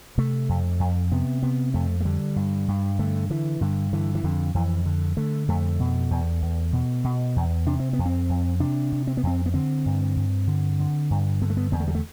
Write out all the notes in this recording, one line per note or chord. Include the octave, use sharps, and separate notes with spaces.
C3 A3
F2
F2
C3 B3
C3 B3
F2 A3
A3
D3 G3
G2
G2
D3 A3
D3 E3
G2 D3
D3 E3
E3
F2 D3
F2 E3
D3
D3 A3
F2 A3
B2
E2
E2
B2
B2
E2
C3 D4
C4
B3
F2
C4
F2
C3 D4
C3
C4
B3
F2 C4
B3
D3 C4
G2
G2
D3
D3
G2
D3 B3
A3
B3
E2 B3
A3
G3
A3